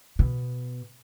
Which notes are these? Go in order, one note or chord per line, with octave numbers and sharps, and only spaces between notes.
B2